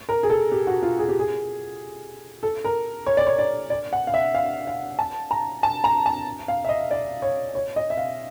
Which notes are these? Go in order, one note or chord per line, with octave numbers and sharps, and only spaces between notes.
A#4
G#4
A4
G4
F#4
F4
G#4
G4
G#4
A4
A#4
C#5
D5
C#5
D5
D5
F#5
F5
E5
F5
F5
A5
A#5
A5
A#5
A5
F5
E5
D#5
D5
C#5
C#5
D#5
E5
F5